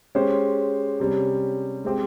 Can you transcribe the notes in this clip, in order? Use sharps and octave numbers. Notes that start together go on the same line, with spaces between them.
G#3 C#4 G4 C5
C3 G3 C#4
G#3 C4 G4 C5